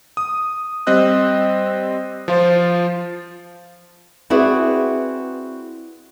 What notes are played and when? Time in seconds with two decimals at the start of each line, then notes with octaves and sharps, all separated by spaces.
0.17 D#6
0.87 G3 C4 D#5 E6 F#6
2.28 F3 F4 C5
4.30 C4 E4 F#4 G#4 B4 D5